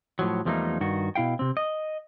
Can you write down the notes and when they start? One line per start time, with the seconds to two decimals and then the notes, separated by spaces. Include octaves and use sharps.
0.19 A2 F3 F#3
0.45 E2 F3 G3 A3 A#3 D#4
0.80 G2 D#3 F#4
1.15 B2 E4 F5 G5
1.39 C3 C4
1.57 D#5